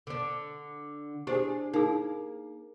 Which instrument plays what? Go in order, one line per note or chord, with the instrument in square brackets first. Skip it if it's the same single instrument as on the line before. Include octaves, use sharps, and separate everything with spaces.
[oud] D3 D4
[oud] D4 G#4 [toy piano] G4 C5
[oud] A#3 [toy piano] D#4 G#4